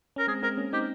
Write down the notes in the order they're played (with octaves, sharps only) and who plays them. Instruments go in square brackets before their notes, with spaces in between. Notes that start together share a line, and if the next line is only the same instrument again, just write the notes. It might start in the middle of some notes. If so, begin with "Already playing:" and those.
[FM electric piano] C#4 [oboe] A#4
[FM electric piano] G#3 C4 [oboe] G#4
[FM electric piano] G#3 C4 [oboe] A#4
[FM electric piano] A#3 C#4
[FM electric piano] C4 D#4 [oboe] G4